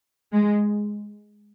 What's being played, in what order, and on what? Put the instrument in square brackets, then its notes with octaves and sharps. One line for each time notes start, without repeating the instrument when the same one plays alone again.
[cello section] G#3